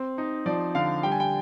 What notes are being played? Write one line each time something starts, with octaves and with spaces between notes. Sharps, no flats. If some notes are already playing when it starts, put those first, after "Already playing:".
Already playing: C4
D#4
F3 D5
D3 F5
G3 G5
G#5
G5